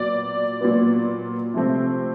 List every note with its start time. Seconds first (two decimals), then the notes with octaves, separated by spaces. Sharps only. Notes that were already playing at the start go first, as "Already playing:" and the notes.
Already playing: A#2 F#3 B3 D5
0.61 A#2 F#3 B3
1.54 C3 F3 A3 C4